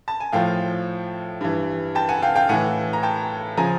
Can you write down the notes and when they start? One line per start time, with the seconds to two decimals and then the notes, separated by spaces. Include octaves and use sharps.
0.08 A5
0.20 G#5
0.32 A2 F3 F5 G5
1.41 G2 E3
1.95 G5 A5
2.09 F#5 G#5
2.22 F5 G5
2.36 F5 G5
2.49 A2 E3 F#5 G#5
2.93 A#5
3.03 G5 A5
3.57 C#3 F3 G#5 A#5